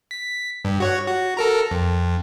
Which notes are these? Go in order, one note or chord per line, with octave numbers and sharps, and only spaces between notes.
B6
G2
F#4 C#5 F#5
F#4
A4 A#4 A#5
F2